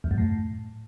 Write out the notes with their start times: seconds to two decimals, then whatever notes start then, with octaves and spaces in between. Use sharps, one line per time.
0.04 E2
0.11 F#2
0.18 A2